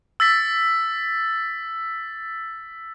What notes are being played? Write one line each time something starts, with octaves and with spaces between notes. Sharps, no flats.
E6 A6 B6